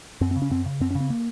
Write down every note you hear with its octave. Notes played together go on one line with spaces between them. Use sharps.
F#2 C4
C4
C#3
C#4
F#2 C4
C#3
F#2 C4
C#4
C#3
C4
A#3